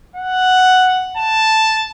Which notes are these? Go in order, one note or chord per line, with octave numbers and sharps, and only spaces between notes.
F#5
A5